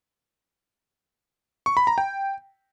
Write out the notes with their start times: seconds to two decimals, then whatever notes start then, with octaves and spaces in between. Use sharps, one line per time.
1.66 C#6
1.77 B5
1.87 A#5
1.98 G5